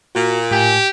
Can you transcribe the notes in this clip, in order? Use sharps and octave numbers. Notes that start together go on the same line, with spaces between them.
A#2 F#4
A2 G4 G#5